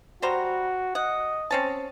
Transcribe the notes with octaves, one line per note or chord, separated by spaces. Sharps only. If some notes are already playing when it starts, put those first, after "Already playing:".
G3 F#4 C5 A#5
D#5 F#5
C4 C#4 A5